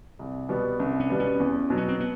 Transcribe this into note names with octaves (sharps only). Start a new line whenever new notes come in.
C2
B2 G3 B3
C2 C#4
C#4
B2 G3 B3
C#4
E2
B2 F#3
C#4
C4
B3